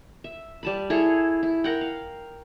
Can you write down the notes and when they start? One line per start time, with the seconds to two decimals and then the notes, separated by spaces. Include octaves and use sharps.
0.24 E5
0.63 G3 A5 B5
0.90 E4 G#4 A4 C#5
1.43 E4
1.64 A#4 F#5 G5
1.81 F5